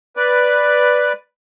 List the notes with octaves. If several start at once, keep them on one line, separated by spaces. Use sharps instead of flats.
B4 D5